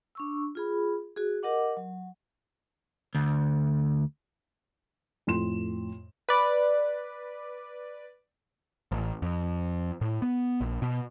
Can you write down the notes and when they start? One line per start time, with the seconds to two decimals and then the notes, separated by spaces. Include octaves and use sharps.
0.15 D4 C#6 E6
0.55 F4 G#4 B5
1.16 F#4 G#4
1.43 G4 A#4 D#5 F#5 D6
1.77 F#3
3.15 D2
5.27 F2 A2 C6 E7
6.29 B4 D5
8.92 A1
9.22 F2
10.01 A2
10.22 B3
10.61 A#1
10.82 B2